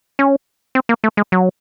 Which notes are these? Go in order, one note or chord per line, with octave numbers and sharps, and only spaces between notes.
C#4
C4
A#3
A3
G#3
F#3